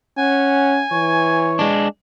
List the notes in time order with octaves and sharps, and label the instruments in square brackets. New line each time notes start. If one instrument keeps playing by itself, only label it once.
[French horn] C#4 [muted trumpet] F#5 [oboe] G#5
[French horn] E3 [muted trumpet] C#5
[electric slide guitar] G#3 D4